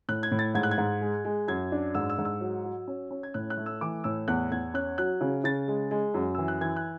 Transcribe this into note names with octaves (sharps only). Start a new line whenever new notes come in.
A2 F#6
G#6
A2
A6
G#2 G#6
F#6
G#6
G#2
G#3
G#3
F#2 G#6
D4
G#2 E6
E6
G#2
E6
F#3
F#3
C#4
C#4
G#6
A2 F#6
F#6
A3
E6
E3 D6
A2 E6
E2 F#6
E2 G#6
C#4 F#6
F#3 F#6
C#3
C#3 A6
G#3
G#3
F#2
E3 E6
F#6
E3 G#6
F#6